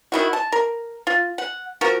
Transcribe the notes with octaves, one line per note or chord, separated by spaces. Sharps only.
D#3 E4 F#4
A5
A#4
F4
F#5
F3 F#4 A#4